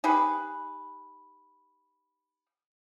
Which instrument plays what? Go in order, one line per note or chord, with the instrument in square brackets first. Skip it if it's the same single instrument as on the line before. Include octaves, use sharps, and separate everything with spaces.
[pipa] D#4 G4 G#4 B4